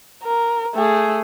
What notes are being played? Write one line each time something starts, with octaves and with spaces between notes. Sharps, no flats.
A#4
A3 G#4